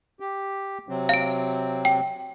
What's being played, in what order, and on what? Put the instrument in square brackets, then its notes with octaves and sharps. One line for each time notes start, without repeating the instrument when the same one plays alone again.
[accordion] G4
C3 F#3 C4
[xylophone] F5 D7
G5